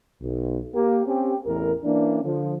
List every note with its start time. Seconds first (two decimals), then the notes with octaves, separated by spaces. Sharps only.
0.21 B1
0.74 A#3 G4
1.05 C4 C#4 G4
1.46 A1 E2 E3 A#4
1.84 E3 A#3 C#4 D4
2.24 D3 F3